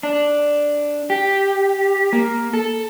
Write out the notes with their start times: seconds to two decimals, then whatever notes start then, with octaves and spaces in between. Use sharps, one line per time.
0.03 D4
1.10 G4
2.13 A#3
2.54 A4